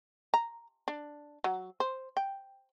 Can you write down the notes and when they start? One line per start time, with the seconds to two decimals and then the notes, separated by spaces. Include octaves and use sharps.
0.34 A#5
0.88 D4
1.44 F#3
1.80 C5
2.17 G5